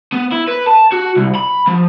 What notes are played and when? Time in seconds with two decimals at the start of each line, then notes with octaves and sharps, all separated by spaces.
0.12 B3
0.32 E4
0.48 B4
0.66 A5
0.92 F#4
1.16 C2
1.35 B5
1.67 F3